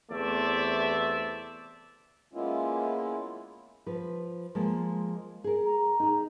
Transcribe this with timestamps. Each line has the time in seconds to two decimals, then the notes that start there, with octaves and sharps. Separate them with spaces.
0.11 E2 C3 A3 C5 D5 E5
2.33 G#3 A#3 B3 C#4 E4 F4
3.86 F3 B4
4.55 F3 G#3 A#3
5.44 G#4 A#4
5.65 A#5
6.00 D#4 G#4